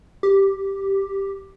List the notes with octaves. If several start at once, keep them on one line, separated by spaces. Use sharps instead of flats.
G4